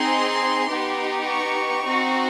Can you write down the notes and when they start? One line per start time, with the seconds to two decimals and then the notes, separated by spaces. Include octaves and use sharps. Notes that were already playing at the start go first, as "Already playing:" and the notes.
Already playing: C4 D#4 G#4 C6
0.68 B3 D#4 G4
1.28 C#6
1.86 C4 D#4 F#4